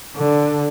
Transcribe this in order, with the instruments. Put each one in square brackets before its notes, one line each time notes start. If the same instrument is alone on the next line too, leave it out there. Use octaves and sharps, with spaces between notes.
[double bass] D3